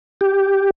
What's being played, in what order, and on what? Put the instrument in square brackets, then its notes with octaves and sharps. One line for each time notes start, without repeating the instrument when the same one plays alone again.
[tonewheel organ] G4